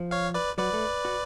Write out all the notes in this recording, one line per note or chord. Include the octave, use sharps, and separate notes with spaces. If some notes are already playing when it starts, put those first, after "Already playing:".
Already playing: F3
C#5 F5
B4 D5
F#3 B4 D5
A3
F#4